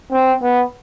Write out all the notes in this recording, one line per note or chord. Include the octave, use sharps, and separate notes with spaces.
C4
B3